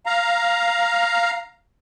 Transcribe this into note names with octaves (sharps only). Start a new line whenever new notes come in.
F5 A#5